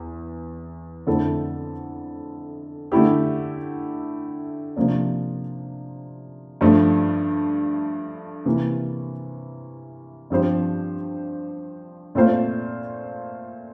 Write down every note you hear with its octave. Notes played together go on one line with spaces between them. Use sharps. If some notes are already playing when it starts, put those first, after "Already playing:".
Already playing: E2
F2 D3 A3 E4 A4
D3 A3 E4 G4
C3 F3 A#3 D4
G2 F3 A3
C3 E3 A#3
G2 F3 C4 G4 C5
A#2 A3 C4 F4 C5